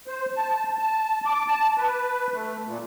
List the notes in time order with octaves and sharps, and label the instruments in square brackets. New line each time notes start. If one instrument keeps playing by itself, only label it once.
[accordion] C5
A5
A5
D6
A5
B4
A3
A#2